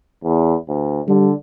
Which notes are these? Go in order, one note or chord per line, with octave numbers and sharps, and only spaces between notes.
E2
D2
D3 G3